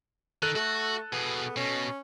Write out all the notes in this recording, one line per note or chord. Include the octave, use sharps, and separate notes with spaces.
D#3 A4 F#6 D#7
A3 F#4
B2 B3 G#4
B2 C#4